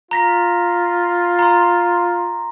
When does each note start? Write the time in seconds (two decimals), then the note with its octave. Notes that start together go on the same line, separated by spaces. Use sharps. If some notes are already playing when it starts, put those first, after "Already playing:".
0.11 F4 A#5 A#6 B6
1.39 A#5 C6